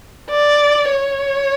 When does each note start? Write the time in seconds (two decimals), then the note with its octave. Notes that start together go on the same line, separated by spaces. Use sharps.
0.30 D5
0.91 C#5